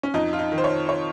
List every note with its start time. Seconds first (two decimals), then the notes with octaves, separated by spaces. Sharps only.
0.03 C#4
0.14 F2 D#4
0.33 F4
0.39 D#4
0.52 D#3
0.58 C5
0.64 C#5
0.89 C#5